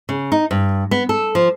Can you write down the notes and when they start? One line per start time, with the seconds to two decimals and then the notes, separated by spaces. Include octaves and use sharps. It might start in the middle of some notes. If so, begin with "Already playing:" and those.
0.09 C#3
0.32 D#4
0.51 G2
0.91 B3
1.09 A4
1.35 F3